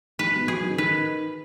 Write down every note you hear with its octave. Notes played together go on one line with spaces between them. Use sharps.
G#2 B4
B2
F#3 G#4
D#3
C#3
D#3 B4